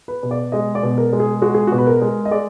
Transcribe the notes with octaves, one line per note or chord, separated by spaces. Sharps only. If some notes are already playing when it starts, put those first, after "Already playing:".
B4
B2
D5
G#3 D#5
D5
B2
A#4
G#3
G#4
G#3 F#4
G#4
B2 F#4
B4
A#4
G#3
D#5
G#3 D5